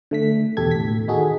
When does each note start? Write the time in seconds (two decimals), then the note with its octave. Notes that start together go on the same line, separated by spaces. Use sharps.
0.11 D3 A3 B6
0.57 E2 B2 G4 A4 G#6
0.71 A2 B6
1.08 D#3 D#4 F#4 G#4 A4